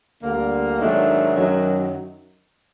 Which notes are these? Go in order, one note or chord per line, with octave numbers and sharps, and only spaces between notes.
D2 D3 G3 A#3
G#2 D#3 F#3 A3 D4
F#2 D#3 F#3